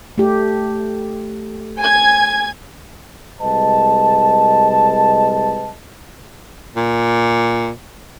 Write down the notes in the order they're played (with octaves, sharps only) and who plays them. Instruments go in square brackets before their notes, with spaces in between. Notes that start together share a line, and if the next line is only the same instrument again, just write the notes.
[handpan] A3 G4
[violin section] G#5 G#6
[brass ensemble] C2 G#3 B4 D#5 A5
[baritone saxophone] A#2